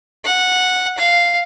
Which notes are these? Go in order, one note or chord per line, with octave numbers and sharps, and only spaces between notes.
F#5
F5